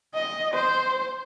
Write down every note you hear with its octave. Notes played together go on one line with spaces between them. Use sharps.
D#5
C5